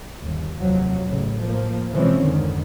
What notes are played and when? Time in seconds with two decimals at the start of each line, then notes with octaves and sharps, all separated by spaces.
0.20 G1 D#2
0.58 F1 D#2 F3 F#3
1.05 A1 A2 C#3
1.41 F3 A#3
1.92 B2 E3 F3 G#3 C4 C#4
2.22 F2 G#2 D3 D#3